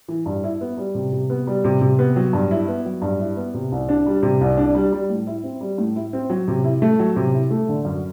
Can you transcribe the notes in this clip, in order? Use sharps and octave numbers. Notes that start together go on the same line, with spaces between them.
E3
G2
E4
B3
G3
C3
C3
B3
G3
C3
C3
B3
F#3
G2
E4
B3
F#3
G2
E4
B3
C3
C2
D4
G3
C3
C2
D4
G3
G3
A2
E4
C4
G3
A2
E4
C4
F#3
C3
E4
A3
F#3
C3
E4
A3
D3
F#2